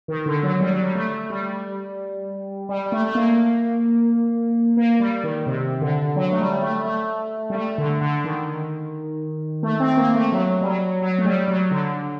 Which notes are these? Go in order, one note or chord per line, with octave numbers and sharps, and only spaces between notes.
D#3
D3
F#3
G3
F#3
G3
A3
G3
G3
G3
A3
A3
A#3
A#3
G3
D#3
C3
D3
F#3
A3
G3
A3
A3
G3
A3
D3
D3
D#3
A3
C4
A#3
A3
F#3
G3
F#3
F#3
A3
G3
F#3
D3